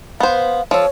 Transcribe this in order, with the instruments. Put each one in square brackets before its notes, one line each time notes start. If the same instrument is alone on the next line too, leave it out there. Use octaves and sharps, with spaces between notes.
[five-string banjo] B3 C5 [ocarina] F5
[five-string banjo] F3 A4 [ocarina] C#5